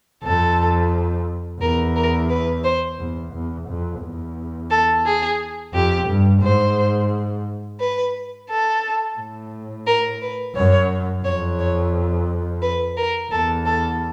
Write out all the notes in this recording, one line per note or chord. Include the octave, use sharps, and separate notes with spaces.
F2 A4
E2 A#4
A#4
B4
C5
E2
E2
F2
E2
A4
G#4
F2 G4
G2
G#2 C5
B4
A4
A2
A#4
B4
F#2 C#5
F2 C#5
C#5
B4
A#4
E2 A4
A4